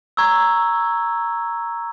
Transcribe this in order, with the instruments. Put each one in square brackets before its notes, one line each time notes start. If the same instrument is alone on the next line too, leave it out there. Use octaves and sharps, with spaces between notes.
[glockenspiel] A#5 C#6 E6 G#6